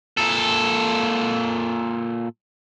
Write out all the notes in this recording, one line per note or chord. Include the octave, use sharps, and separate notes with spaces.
A#2 A4